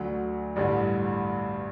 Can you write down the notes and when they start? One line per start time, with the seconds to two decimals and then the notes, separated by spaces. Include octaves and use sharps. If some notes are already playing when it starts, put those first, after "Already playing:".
Already playing: D2 D3 F#3
0.56 A1 G2 D3 G3